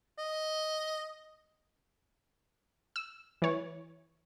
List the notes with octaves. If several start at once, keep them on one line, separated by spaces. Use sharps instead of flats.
D#5
E6
E3 C#5